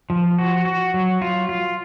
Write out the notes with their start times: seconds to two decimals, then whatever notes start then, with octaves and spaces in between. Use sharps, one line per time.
0.10 F3
0.39 F#4
0.65 F#4
0.94 F#3
1.22 F4
1.49 F4